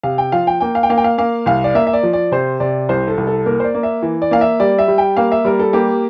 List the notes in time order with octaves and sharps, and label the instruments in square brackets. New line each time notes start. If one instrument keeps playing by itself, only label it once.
[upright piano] C3 F5
G5
F3 F5
G5
A#3 G5
F5
G5
A#3 F5
G5
F5
A#3 F5
C2 F5
D5
A#3 E5
E5
D5
F3
D5
C3 C5
C3 D5
C2 C5
A4
C2
A4
A#3 A#4
C5
D5
A#3
E5
E3
D5
A#3 F5
E5
G3 D5
E5
G3
G5
A#3 F5
E5
G3 A#4
A4
A#3 G4